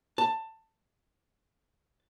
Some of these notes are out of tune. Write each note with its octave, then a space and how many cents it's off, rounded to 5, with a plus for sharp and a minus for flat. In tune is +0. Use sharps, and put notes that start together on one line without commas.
A5 +15